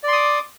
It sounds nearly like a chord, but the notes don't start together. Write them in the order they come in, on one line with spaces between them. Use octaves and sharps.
D5 C6 D#6 D6